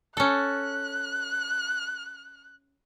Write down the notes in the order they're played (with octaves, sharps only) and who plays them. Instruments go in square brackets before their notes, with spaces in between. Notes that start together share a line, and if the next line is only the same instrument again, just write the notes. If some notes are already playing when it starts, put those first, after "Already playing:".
[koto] C#4 A4 [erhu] F#6